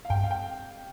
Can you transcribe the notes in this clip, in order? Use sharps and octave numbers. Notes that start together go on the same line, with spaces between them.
F5
G2 G5
F5
G5